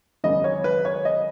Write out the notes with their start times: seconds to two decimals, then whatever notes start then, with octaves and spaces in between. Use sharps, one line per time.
0.24 G#1 F#2 C#3 D#5
0.44 C#5
0.64 B4
0.85 C#5
1.05 D#5